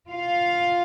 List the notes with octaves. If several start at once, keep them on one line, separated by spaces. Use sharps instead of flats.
F4 F5